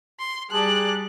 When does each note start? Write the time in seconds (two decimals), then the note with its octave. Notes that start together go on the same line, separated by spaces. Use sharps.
0.20 C6
0.51 G3 G#4 D5 A5 A#5 F#6